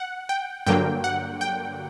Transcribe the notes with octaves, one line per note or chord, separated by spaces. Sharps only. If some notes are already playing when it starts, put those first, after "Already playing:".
Already playing: F#5
G5
G2 D3 F#3 A#3 G5
F#5
G5